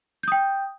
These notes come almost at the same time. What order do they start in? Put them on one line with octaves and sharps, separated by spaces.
G6 D#6 G5